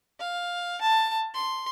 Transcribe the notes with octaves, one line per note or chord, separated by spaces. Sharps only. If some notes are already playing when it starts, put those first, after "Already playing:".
F5
A5
C6